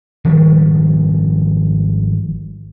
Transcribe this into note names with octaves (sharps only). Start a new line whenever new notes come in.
G#1 D#3 F3 G3